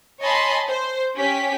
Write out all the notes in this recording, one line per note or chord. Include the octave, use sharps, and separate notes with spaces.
C#5 D#5 G#5 A5 B5 C6
C5
C#4 G4 B6